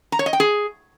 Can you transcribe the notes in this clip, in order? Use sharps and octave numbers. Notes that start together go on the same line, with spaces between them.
A#5
C#5
D#5
G5
G#4